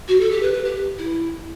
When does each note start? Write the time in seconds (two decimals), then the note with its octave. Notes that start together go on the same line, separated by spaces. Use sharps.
0.08 F#4
0.20 A4
0.31 G4
0.43 B4
0.54 B4
0.65 G4
0.98 E4